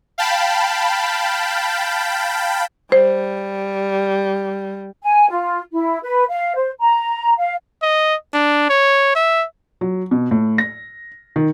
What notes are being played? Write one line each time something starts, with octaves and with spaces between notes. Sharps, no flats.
F5 G5 A5 B5
G3 C5
G#5
F4
E4
B4
F5
C5
A#5
F5
D#5
D4
C#5
E5
F#3
B2
A2
A#6
D#3